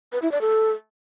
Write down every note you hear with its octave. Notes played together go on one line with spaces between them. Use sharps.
B4
E4
D5
A4